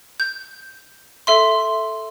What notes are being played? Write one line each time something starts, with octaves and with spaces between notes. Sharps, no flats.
G6
A4 E5 C6